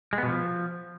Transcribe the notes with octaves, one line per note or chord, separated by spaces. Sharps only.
G#3
B3
B2
F3